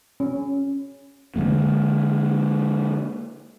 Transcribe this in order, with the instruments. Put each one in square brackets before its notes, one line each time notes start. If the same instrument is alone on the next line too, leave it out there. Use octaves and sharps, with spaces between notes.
[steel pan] C#4
[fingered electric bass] D3 F3 G#3 A#3